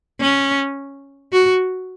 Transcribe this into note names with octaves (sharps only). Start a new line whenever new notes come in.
C#4
F#4